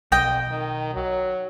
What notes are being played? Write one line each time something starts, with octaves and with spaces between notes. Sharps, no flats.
B1 F2 D#5 G5
D#3
F#3